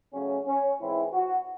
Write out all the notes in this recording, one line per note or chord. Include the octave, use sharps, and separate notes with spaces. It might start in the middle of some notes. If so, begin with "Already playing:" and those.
C#3 F#3 A3 C#4
C#4
G#2 E3 C4 E4
F#4